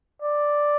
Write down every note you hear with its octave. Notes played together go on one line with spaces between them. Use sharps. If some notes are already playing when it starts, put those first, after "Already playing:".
D5